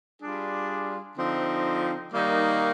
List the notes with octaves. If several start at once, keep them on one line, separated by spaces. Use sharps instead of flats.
G3 D4 F4 G#4
D3 F3 C4 D#4
D#3 G3 A#3 D#4